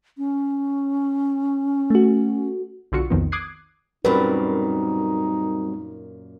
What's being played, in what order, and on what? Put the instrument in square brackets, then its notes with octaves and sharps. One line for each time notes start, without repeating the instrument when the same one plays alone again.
[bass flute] C#4
[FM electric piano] A3 F#4
[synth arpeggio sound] B1 D3 F4 F#4 C#7
B1 F2 D#3 F3 B3
D6 D#6 F#6 G#6 C7
[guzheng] F#2 A#2 [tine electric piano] G3 C4 F#4 [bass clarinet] D#4 [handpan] B4